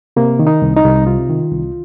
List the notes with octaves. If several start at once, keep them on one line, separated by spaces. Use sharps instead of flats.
C3 A#3
D#3
D#4
C2
D#4
C2
C3 F4
D#3
C2